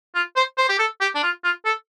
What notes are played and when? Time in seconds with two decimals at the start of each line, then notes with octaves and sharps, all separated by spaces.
0.15 F4
0.36 C5
0.58 C5
0.69 G4
0.79 A4
1.01 G4
1.15 D4
1.23 F4
1.44 F4
1.65 A4